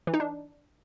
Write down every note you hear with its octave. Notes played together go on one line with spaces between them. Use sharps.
E3
D#4
D4